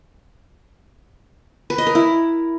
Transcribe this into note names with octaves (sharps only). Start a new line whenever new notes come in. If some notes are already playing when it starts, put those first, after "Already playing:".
B4
D#5
A#4
E4